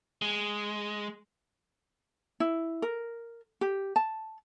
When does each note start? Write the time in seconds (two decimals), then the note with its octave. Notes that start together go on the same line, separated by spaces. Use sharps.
0.22 G#3
2.40 E4
2.82 A#4
3.61 G4
3.96 A5